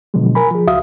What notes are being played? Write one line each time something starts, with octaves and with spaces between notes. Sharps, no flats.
B2 D3 F3 F#3 G#3
A#4 G#5 B5
F3 G#4
C#2 F#4 E5 F5 D#6